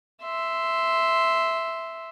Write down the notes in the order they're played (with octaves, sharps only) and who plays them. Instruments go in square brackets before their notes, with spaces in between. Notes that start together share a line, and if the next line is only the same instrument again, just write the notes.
[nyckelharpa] E5 C6